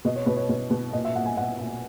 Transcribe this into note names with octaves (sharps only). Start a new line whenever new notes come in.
B2 D#5
C#5
B2 B4
C#5
B2
B2
A#2 D#5
E5
A#2 F#5
G#5
A#2 F#5
A#2